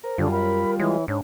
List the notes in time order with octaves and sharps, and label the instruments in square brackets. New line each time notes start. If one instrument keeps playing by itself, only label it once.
[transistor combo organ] A#4 [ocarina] C5
[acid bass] F#2 [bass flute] D3 [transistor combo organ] G3 F4
[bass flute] A#4 [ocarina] B5
[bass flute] E3 [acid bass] G#3 [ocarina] C#5
[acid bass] G#2 [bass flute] D4 [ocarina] C#5